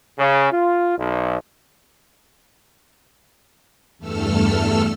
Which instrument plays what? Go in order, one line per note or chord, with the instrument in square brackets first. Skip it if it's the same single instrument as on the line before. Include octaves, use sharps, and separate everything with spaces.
[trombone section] C#3
F4
B1
[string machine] E2 G2 A3 A4 E6 F6